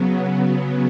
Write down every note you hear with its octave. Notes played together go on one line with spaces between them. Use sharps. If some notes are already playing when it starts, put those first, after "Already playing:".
Already playing: C#3 F#3 B3